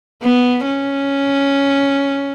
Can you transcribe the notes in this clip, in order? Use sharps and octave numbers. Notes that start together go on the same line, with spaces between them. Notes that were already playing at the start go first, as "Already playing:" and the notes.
B3
C#4